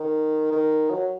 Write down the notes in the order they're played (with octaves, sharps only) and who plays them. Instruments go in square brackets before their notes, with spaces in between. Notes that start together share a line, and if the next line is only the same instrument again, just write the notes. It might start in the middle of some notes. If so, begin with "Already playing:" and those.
Already playing: [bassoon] D#3
D#3
F#3